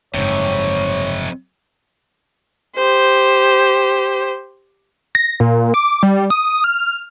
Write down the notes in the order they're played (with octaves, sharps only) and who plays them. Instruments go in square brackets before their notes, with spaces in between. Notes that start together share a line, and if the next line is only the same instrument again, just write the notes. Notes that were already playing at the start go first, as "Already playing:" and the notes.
[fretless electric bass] F#1 G#2 [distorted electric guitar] F2 C3 [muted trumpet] C#5
[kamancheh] G4 C5
[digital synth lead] A#6
A#2
D6
G3
D#6
F6